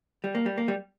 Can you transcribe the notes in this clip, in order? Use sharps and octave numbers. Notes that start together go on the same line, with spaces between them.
G3
A#3
G3
A#3
G3